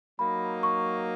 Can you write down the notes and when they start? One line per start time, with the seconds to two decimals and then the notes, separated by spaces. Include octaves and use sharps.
0.19 F#3 A#3 D#4 B5
0.63 C#6